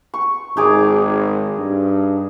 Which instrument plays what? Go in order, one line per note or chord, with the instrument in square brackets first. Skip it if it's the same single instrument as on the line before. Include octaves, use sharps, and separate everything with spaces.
[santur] C#6
[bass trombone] G#1 [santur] D#4 G#4 D6
[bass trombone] G2